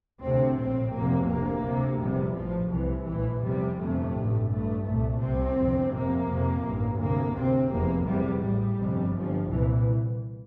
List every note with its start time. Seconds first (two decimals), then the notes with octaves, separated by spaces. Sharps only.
0.22 D2 C3 C4
0.57 A#1 A2 C4
0.93 F1 F2 C3 A#3
1.29 D2 C3 A#3
1.65 D2 C3
2.00 F1 E2 C3 G3
2.36 A1 A2 F3
2.72 C2 C3 E3
3.07 A#1 A2 E3
3.43 F1 E2 C3 G3
3.79 G1 F2 C3 A3
4.15 A1 G2
4.50 A1 G2 A3
4.86 C2 A#2 A3
5.21 C2 C3 C4
5.57 G1 F2 C3
5.93 F1 F2 C3 A#3
6.29 F1 F2 C3
6.64 A1 G2
6.99 D2 C3 A#3
7.36 D2 C3 C4
7.71 F1 E2 C3 A#3
8.07 F1 E2 C3 G3
8.43 A1 A2 G3
8.78 G1 F2 C3
9.14 G1 G2 F3
9.49 C2 A#2 E3